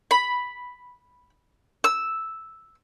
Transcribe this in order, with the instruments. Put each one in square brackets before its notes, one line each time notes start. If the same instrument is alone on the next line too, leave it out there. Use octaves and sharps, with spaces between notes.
[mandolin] B5
E6